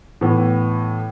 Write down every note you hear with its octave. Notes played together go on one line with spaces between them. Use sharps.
A2 E3 B3